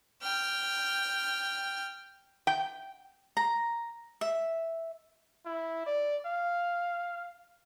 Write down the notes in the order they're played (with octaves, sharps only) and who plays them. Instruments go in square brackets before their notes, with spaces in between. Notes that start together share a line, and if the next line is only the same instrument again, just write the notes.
[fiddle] G5 F6
[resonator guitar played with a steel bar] G5
[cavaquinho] A#5
E5
[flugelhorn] E4
D5
F5